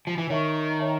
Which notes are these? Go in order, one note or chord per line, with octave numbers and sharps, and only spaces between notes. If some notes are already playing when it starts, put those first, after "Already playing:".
F3
E3
D#3 C#5 E5 A5 C#6
C#5 E5 A5 C#6